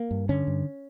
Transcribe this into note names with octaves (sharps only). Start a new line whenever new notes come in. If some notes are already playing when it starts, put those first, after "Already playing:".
Already playing: A#3
G2
D3 C#4
G2